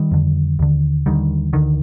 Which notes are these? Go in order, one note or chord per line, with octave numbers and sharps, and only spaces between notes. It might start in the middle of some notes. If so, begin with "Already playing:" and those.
Already playing: D#3 G3
F2 D3
D#2 D3
D#2 D3 D#3 G3
D2 D3 D#3